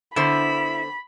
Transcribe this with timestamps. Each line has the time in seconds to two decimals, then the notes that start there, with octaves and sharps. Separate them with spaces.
0.16 D3 B3 E4 C5 B5